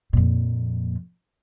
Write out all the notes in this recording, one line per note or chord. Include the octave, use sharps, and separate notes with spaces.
F2 A#2